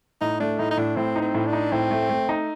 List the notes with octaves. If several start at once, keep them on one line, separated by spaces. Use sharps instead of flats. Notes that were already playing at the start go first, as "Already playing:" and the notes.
A2 D#4
A3 D4
A2 D#4
D#4
A2 D4
A2 C4
D#4
C4
A2
D4
D#4
A2 C4
A3
A3
D#4